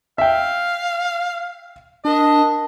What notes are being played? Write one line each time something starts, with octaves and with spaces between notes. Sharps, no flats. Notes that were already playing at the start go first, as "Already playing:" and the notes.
E5 F5 G5
D4 A#4 D#5 A5